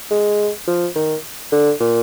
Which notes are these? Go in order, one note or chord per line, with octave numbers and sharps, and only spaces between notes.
G#3
F3
D#3
D3
A#2